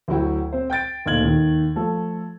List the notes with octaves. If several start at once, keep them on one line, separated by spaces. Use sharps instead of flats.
D2 F#3 E4 F#4 G5
C4 C5
G5 G6 A6 D7
D2 A#2 D#4 G#6 F#7
D#2 D#3
F3 A3 A4